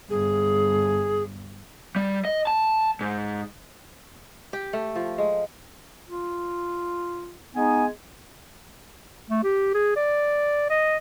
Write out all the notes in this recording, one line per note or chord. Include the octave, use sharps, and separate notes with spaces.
G1 G#4
G3
D#5
A5
G#2
G4
A3
F3
G#3
F4
G#3 B3 D#4 G#5
A3
G4
G#4
D5
D#5